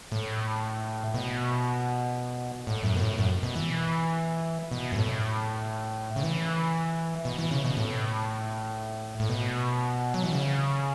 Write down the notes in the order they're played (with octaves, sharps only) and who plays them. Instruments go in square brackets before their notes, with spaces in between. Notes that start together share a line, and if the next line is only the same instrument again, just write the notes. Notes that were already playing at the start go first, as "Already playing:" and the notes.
[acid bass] A2
B2
A2
F#2
B2
A2
F#2
B2
E3
B2
F#2
A2
C#3
E3
B2
E3
C#3
B2
A2
A2
B2
F#3
E3
C#3